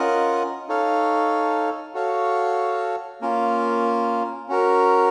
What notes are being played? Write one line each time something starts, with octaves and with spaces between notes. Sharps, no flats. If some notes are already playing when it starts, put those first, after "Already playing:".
Already playing: C#4 F4 A#4 D#5 F#5
D#4 A4 C#5 F5
F#4 A4 C#5 F5
A#3 C#4 F4 A#4
C#4 F#4 A#4